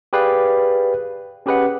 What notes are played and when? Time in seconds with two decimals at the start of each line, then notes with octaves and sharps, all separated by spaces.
0.13 G4 G#4 B4 D5 F5 G5
1.46 C#4 G4 G#4 B4 D#5 F#5